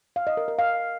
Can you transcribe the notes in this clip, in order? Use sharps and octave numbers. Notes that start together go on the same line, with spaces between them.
F5
D#5
A#4
A#4
F5